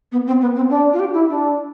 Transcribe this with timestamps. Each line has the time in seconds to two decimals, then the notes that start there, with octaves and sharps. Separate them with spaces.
0.12 B3
0.27 C4
0.41 B3
0.56 C4
0.70 D4
0.93 F4
0.99 G4
1.14 E4
1.29 D4